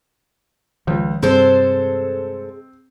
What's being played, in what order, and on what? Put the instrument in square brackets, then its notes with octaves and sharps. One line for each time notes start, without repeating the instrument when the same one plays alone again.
[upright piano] C#2 [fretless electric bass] D#3 F3
[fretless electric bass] G2 C3 G3 [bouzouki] G#3 A4 C5 [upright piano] C4